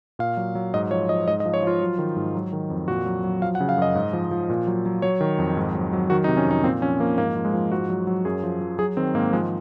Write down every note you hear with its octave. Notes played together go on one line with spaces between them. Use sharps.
A#2 F5
F#3
F#3
G#2 D#5
F3 C#5
F3 D#5
G#2 D#5
D#5
F3
C#5
F3 F4
F#3
D#3
G#2
F#3
D#3
F2
A#2 F#4
F#3
F#3
F3 F5
F#5
C#3
F5
F#2 D#5
G#2
F3
F3
A#2
F#3
F#3
F#3 C#5
D#3
F2
G#2
F#3
F#3
D#3 F#4
D#4
C3
C#4
F2 D#4
A#2 C4
F3 C#4
F3 A#3
G#2 A#3
F3
G#3
F3
G#2 F#4
F#3
F#3
F#2 G#4
F3
F3
F#3 G#4
D#3 C4
G#2 A#3
F3 G#3